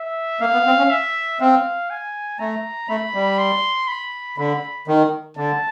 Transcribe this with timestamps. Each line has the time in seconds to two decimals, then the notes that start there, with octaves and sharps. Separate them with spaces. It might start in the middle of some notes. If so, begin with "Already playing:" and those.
Already playing: E5
0.40 A#3 F5
0.53 B3
0.66 C4
0.78 C#4
0.90 E5
1.40 C4 F5
1.90 G#5
2.39 A3 A#5
2.89 A3 B5
3.14 G3
3.38 C6
3.88 B5
4.38 D3 B5
4.88 D#3
5.37 D3 A5